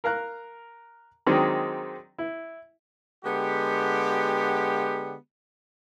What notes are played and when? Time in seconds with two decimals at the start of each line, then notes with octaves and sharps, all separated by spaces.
0.04 A#4 F5 A#5 F#6
1.26 D#3 F#3 G#3 C4 D4 D#4
2.18 E4
3.24 D3 G#3 B3 G4